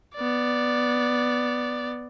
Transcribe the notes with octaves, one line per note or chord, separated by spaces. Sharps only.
B3 D5